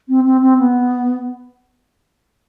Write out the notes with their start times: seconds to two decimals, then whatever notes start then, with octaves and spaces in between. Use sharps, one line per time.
0.09 C4
0.26 C4
0.42 C4
0.59 B3